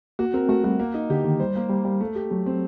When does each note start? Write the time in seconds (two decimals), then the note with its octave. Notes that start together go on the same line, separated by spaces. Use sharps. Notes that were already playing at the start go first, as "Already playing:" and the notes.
0.19 A#3 F#4
0.34 C4 A#4
0.49 A3 F#4
0.64 G3 F#4
0.79 A#3
0.94 D#4
1.10 D3 G4
1.24 D#3 A#3
1.40 G3 C5
1.56 A#3
1.70 G3 A#3
1.85 G3 A#3
2.01 A3
2.15 G4
2.31 F#3 A3
2.46 C4